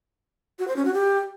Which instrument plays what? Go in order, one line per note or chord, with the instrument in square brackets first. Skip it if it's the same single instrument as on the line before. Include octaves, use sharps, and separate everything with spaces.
[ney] F#4
C5
C#4
F#4
G4